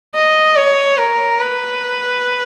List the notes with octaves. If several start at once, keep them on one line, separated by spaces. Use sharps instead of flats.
D#5
C#5
A#4
B4